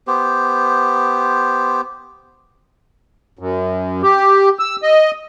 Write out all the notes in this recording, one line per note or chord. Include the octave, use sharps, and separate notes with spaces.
B3 G4 C5
F#2
G4
E6
D#5